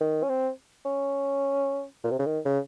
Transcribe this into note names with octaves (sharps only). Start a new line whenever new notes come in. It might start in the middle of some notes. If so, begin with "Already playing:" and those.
D#3
C#4
C4
C#4
A#2
C3
C#3
D#3
C#3